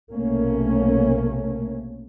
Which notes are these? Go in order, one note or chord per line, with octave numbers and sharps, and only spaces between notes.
B1 C3 A3 A#3 C#4